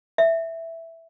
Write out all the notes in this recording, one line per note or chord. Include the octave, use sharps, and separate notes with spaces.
E5